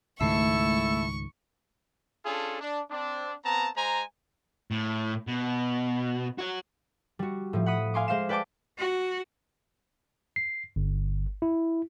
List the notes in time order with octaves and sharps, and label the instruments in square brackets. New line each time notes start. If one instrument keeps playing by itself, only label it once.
[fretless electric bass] C#2 G#2 D#3 [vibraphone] A3 [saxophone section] E4 A4 E5 [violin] C#6
[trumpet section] C#4 D4 F4 G#4 A4
D4
C4 D4
B3 C4 A5 A#5
G#3 C5 G#5 A#5
[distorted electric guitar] A2
B2
F#4 C#5
[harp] G3 F#4
A2 F3
F#5 B5 D#6
F5 G#5 C6 D6
G#3 C5 F5 C7 E7
B4 D5 G5 A5 D6
[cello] F#4
[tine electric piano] C7
G1
E4